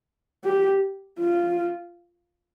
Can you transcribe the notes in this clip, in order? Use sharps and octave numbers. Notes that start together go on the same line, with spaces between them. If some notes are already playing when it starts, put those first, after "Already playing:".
G4
F4